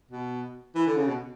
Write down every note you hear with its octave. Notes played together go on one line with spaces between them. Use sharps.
B2
E3
D3
C#3
B2